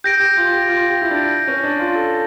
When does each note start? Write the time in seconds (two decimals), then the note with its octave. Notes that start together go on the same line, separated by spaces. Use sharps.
0.04 G4 G6 A#6 D7
0.20 G4
0.37 F4
0.52 G4
0.69 F4
0.89 G4
1.02 E4
1.11 D4
1.48 C#4
1.64 D4
1.80 F4
1.95 A4